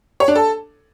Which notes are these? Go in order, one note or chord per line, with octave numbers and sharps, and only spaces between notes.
C#5
D4
A4